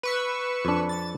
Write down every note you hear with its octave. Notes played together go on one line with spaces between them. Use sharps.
B4 C#6 E6
F2 D4
A6